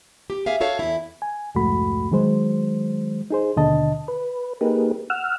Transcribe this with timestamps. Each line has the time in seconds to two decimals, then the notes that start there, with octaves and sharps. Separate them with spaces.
0.30 G4
0.46 G#4 E5 F5
0.61 F#4 A4 C#5 F5
0.79 E2 E4
1.22 G#5
1.55 C2 F2 G#2 A3 F#4 B5
2.11 D#3 F#3 G#3 C5
3.30 D#4 G#4 C5
3.56 D#2 B2 D3 D#5 A5
4.08 B4
4.61 A#3 D#4 G4 G#4 A#4 B4
5.10 F#5 E6 F6